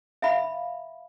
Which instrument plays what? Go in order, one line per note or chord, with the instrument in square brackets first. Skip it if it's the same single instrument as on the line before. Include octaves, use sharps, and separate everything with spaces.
[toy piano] E5 F5 B5